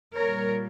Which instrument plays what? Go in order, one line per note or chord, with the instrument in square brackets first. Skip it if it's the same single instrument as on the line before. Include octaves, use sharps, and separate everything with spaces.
[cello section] A#2 G3 A#4 C#5